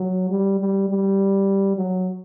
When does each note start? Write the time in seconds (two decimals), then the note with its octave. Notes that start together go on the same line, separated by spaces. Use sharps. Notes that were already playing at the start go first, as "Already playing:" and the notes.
Already playing: F#3
0.30 G3
0.60 G3
0.89 G3
1.77 F#3